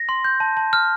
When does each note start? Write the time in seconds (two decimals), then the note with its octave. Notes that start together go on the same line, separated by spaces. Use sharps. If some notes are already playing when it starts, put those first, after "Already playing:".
Already playing: A#6
0.09 C6
0.24 G6
0.40 A5
0.57 A5
0.73 F6